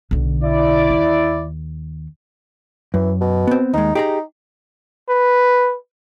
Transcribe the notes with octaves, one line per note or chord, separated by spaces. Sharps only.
B1 D3
E4 D5
D#2
F#2 E3
B2
B3 C4
D#2 G#3 D#4
D#4 G4 G#4 A#5
B4